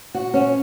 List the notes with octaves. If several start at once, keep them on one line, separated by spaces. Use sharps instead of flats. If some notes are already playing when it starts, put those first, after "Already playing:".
F#4
C#4